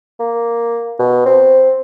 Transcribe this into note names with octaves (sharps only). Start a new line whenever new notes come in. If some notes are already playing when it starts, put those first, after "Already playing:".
A#3
B2
C4